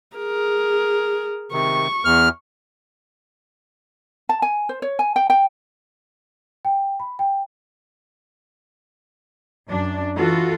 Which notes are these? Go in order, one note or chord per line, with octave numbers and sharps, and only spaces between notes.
G#4 A#4
C3 D#3 C#6
E2 F6
A5
G#5
C5
C#5
G#5
G5
G5
G5
B5
G5
F#2 D4
E3 F4 F#4 A4